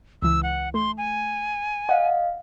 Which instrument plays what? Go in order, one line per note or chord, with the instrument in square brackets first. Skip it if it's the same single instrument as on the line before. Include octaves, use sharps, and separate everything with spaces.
[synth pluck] C#2 E3 [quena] E6
[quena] F#5
[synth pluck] A3 [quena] C6
[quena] G#5
[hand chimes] D#5 F5 [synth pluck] F#5